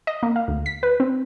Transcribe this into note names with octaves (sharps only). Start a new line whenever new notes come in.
D#5
A#3
F5
D2
B6
B4
C4